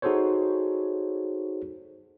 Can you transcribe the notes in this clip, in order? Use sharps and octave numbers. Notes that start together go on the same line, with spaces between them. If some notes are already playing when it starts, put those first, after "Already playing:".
D#4 F#4 G#4 A4 C5 C#5